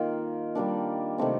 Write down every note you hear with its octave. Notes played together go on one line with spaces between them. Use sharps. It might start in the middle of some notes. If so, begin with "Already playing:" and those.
Already playing: D#3 A#3 F4
D#3 G3 A#3 D4
C3 D#3 A3 C4